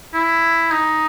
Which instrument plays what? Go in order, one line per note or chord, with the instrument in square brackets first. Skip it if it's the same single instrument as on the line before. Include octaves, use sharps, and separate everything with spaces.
[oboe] E4
D#4